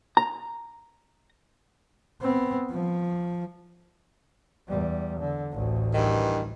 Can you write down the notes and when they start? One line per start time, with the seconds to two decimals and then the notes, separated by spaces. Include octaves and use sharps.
0.17 A#5
2.22 B3 C4
2.71 F3
4.68 E2 G3
5.20 D3
5.52 A1 D2
5.94 G2 D#3 E3